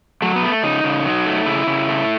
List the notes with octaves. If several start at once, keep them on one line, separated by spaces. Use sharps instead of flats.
F#3 A3
B3
A3
C#3 D#4
C#3
F#3
A3
C#3 E4
C#3
A3